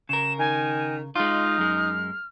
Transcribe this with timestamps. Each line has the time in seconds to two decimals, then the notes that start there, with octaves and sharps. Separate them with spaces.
0.09 C#3 A#4 E7
0.39 D#3 G#5
1.16 G#3 D#4 F4 F6
1.58 F#2 G#3